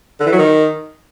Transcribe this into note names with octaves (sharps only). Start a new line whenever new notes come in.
D3
E3
F#3
D#3